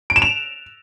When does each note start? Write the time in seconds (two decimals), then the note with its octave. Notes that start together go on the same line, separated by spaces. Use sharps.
0.10 D7
0.16 E7
0.22 F7